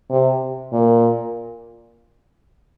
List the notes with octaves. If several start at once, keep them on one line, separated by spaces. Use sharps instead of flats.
C3
A#2